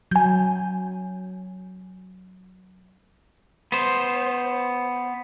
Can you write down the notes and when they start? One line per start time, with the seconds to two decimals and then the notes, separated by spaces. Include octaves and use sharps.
0.11 F#3 G#5 G6
3.72 B3 C5